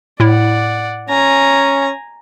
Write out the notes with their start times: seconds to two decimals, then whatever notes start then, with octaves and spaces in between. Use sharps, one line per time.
0.20 A2 E4 D5 F#5
1.09 C#4 G#5 A#5